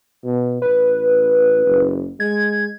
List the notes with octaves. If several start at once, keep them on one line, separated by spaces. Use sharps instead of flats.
B2
A1 B4
F#1
G#3 G#6